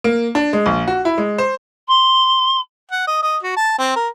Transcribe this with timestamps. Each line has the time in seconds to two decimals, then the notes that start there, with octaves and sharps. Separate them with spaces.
0.04 A#3
0.35 D4
0.53 G#3
0.66 A#1
0.88 F#4
1.05 E4
1.18 G#3
1.38 C5
1.88 C6
2.92 F#5
3.07 D#5
3.23 D#5
3.43 F#4
3.57 A5
3.79 C4
3.96 A#4